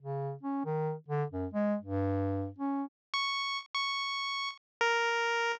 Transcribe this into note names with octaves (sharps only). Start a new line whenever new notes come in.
C#3
C#4
D#3
D3
F#2
G#3
G2
C#4
C#6
C#6
A#4